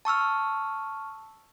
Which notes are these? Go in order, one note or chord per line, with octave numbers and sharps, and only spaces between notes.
A5 C#6 E6 F6